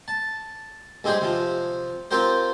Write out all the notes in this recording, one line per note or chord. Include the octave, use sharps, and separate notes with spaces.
A5
G2 G#3 G4 G#4 C5
C3 F3
C4 F4 G4 A#4 C5